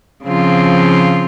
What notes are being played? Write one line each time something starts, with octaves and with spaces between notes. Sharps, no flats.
C#3 F3 C4 F4